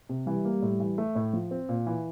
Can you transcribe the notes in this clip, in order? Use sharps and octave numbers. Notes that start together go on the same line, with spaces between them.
C3
E3 G3
A#3
A2
E3
A3
A2
F3
C4
A#2
E3